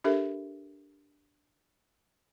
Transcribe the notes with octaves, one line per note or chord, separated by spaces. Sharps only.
D4 G4 A4 A#4 E5